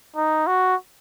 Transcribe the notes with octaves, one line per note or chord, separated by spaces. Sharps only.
D#4
F#4